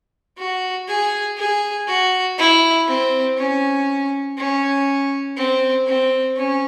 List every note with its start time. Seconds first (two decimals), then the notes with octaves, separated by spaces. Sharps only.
0.38 F#4
0.88 G#4
1.38 G#4
1.87 F#4
2.38 E4
2.88 C4
3.37 C#4
4.37 C#4
5.37 C4
5.87 C4
6.37 C#4